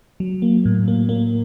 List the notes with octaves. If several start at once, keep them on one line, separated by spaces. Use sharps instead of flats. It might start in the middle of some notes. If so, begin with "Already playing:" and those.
F#3
A#3
A2
A#3
A#3